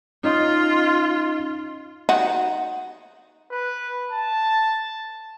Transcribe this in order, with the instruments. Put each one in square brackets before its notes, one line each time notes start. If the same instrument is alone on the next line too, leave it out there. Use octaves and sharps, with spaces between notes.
[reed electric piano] C#4 D#4 D#5 [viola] F4
[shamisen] D#4 F#4
[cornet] B4
A5